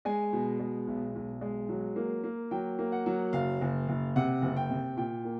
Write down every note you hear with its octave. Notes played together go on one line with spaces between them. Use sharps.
G#3 G#5
B2
G#3
B1
B1
G#3
F#3
A#3
A#3
F#3 G5
A#3
F#5
F#3
F#1 F5
F#1
F#1
C3 F#5
F#1
G5
C3
A#2 G5
A#3